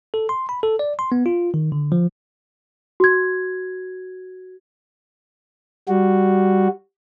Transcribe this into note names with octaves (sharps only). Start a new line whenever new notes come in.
A4
C6
B5
A4
D5
C6
B3
F4
D#3
D3
F3
F#4 G#6
G3 F#4